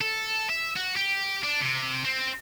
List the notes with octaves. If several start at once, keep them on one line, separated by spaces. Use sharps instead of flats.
A4
E5
F#4
G4
D4
C3
C4